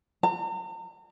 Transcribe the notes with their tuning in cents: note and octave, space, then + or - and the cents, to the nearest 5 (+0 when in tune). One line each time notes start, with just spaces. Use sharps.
A#5 -40